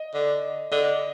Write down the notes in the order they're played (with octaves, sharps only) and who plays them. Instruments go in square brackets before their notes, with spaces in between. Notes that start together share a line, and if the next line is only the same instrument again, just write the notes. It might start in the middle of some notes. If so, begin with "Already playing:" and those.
Already playing: [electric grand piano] D#5
[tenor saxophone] D3
[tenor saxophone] D3 [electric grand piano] D#5